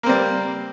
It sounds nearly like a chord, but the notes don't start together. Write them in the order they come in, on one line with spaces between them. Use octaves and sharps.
A#3 C4 G3